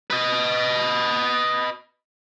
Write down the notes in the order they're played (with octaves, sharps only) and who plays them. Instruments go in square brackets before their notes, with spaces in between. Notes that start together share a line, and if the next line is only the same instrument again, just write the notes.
[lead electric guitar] B4 D#5